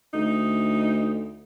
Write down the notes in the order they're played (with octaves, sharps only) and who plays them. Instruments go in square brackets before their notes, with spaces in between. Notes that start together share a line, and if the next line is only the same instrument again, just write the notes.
[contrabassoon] D2 [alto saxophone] D#4